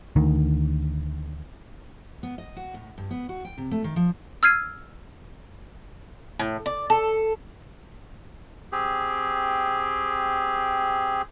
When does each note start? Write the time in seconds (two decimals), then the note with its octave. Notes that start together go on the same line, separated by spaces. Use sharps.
0.16 D2 D#3
2.23 B3
2.38 D#5
2.56 F#4
2.74 A2
2.98 G2
3.11 B3
3.29 F#4
3.45 G5
3.58 C3
3.71 A3
3.84 D#3
3.96 F3
4.43 E6 F6 G#6 C7 D#7
6.39 A2
6.66 D5
6.90 A4
8.72 C4 G4 G#4